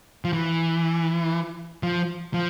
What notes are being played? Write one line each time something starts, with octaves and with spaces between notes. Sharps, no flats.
F3
E3
F3
F3